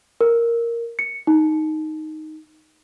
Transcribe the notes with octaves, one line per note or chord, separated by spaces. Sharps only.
A#4
C#7
D#4